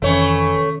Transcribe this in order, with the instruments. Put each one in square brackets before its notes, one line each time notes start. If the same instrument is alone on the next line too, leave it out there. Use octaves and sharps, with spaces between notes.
[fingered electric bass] F1 [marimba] C3 D#3 C#4 [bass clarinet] E3 [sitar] A3 C#5